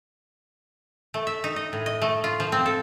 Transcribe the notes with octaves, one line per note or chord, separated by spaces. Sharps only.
A3
E5
D#4
D#5
A2
D#5
A3
F4
F3
C4
A4